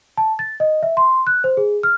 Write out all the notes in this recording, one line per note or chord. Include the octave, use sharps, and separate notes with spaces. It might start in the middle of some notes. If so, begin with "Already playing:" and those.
A5
A6
D#5
E5
C6
F#6
C5
G#4
F6